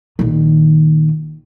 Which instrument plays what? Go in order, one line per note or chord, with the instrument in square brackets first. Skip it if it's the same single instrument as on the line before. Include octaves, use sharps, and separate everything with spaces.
[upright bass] A#1 D#3